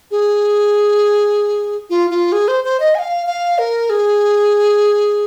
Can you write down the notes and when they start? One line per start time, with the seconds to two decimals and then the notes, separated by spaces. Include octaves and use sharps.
0.11 G#4
1.90 F4
2.10 F4
2.32 G#4
2.48 C5
2.64 C5
2.80 D#5
2.95 G#5
2.99 F5
3.27 F5
3.58 A#4
3.90 G#4